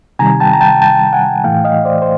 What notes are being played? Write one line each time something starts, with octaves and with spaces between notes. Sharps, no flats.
C3 D#3 G3 G#5 A#5
G5 A5
A#5
G5 A5
G5 A5
F#5 G#5
A2 E3 A3 F5 G5
D#5 F5
C5 D5
C5